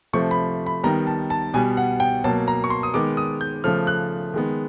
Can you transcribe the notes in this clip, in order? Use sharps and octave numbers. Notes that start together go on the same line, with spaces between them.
C3 F3 A3 C#6
B5
B5
D#3 G3 B3 A#5
A5
A5
B2 G3 B3 G#5
F#5
G5
B2 F#3 A#3 A5
A#5
C#6
C6
D#6
D#3 G#3 B3 D6
D#6
G6
C#3 F3 A3 F6
F#6
D#3 G#3 B3